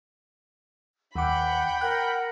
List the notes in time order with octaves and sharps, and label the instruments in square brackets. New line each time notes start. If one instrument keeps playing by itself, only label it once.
[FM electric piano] D#2 D6 [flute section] F#5 [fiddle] G5 B5
[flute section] A#4 F#5 [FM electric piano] F#6